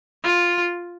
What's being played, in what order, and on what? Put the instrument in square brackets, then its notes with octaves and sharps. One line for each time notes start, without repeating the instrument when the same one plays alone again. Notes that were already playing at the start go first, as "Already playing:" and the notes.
[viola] F4